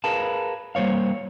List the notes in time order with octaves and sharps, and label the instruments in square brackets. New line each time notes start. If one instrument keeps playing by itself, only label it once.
[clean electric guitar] G#4 A#4 B4 F5 A5
G3 A#3 C5 C#5 F5